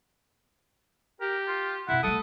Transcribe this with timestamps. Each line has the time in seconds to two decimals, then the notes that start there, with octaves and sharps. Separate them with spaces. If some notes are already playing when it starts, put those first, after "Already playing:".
1.21 G4 A#4
1.48 F4
1.88 F2 B2 E4 F#5
2.03 G3 A3 A4 D#6